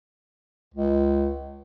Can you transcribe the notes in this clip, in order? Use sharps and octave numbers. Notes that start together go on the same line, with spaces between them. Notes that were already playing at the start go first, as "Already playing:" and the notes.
C#2